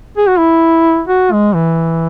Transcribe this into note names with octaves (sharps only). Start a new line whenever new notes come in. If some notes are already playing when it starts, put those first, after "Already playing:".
G#4
F#4
E4
F#4
G#3
E3